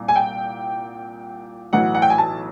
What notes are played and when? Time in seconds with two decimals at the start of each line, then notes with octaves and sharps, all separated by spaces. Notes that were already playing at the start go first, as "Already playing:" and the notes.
Already playing: C2 A#2
0.08 G#5
0.16 G5
1.73 B1 A2 E3 F#5
1.94 F#5
2.02 G5
2.10 G#5
2.18 A5